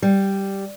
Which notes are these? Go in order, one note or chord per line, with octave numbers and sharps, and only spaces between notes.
G3